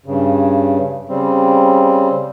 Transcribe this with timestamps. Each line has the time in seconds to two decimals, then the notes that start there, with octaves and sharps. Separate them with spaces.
0.06 G2 C#3
1.09 C#3 G3 C4